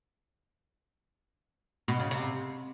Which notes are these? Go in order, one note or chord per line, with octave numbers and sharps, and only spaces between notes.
B2
C#3
C3